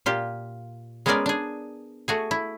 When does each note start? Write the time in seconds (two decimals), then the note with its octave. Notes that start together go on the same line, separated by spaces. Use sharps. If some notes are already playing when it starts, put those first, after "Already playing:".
0.06 A#2 F4 G4
1.06 G#3 B3 C#4 G#4 A#4 D5
1.26 D4 G#4
2.08 A3 F#4 G#4
2.31 E4